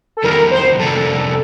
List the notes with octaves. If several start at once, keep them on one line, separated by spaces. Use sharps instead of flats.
A4
F2 D#3 G3 A#4
C5
F2 C3 G3 A#3 D4 A4